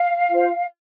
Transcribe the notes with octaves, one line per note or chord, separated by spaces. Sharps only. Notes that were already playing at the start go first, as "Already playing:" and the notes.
Already playing: F5
F4 C5